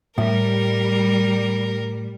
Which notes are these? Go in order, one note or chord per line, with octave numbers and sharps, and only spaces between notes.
A2 G3 A#4